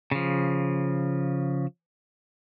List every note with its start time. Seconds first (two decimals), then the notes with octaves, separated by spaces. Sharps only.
0.11 C#3 F3